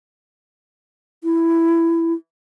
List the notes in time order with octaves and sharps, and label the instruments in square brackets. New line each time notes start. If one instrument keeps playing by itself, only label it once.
[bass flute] E4